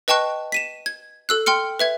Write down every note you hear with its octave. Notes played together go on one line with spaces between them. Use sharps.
B4 D#5 G5 A5 C#6 F#6
B6 D#7 E7
G#6
A4 E6 F#6
G5 C6 F6 C#7
B4 E5 G#6